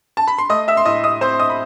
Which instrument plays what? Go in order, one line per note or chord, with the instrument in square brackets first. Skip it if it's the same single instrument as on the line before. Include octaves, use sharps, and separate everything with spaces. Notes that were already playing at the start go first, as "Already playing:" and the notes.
[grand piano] A5
B5
C6
A3 D#5 D#6
E5 E6
C6
A2 D#5 D#6
D#5 D#6
C4 C5 C6
D#5 D#6
B5